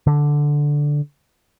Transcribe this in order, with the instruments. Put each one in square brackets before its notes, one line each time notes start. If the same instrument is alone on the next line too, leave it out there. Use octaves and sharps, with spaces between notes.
[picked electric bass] D3